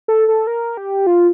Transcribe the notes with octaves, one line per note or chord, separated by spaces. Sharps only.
A4
A4
A#4
G4
F4